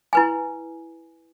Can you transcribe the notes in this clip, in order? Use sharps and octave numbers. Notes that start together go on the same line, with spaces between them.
E4 B4 G#5